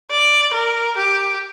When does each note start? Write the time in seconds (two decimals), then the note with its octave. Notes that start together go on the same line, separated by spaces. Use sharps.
0.11 D5
0.54 A#4
0.97 G4